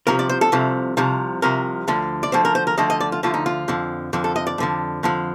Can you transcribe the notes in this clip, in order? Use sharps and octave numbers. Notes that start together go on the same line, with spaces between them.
C2 C3 F3 A#4
D5
C5
A4
C2 C3 F3
C2 C3 F3
C2 C3 F3 A#4
D2 D3 F3
D5
D2 D3 F3 C5
A#4
C5
A#4
D2 D3 F3 D#5
D#5
D5
F4
D2 D3 F3 F4
D#4
F4
F2 D3 F3
F2 D3 F3
A4
D#5
D5
F2 D3 F3
F2 D3 F3